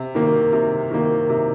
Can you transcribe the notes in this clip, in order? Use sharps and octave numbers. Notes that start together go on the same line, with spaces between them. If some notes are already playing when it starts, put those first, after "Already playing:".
Already playing: C3
D#3 A#3
C3
D#3 A#3
C3